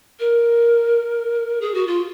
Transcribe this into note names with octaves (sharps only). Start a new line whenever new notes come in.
A#4
G#4
F#4
F4